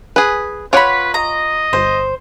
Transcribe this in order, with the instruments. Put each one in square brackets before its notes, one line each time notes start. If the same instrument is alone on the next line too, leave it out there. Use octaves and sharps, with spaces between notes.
[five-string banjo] G#4 B4
[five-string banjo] F4 C#5 F#5 [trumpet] B4 [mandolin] B5 D6
[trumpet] D#5 [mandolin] A#5
[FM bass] G1 [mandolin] C5